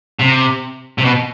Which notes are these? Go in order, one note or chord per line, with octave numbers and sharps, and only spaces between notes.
C3
C3
B2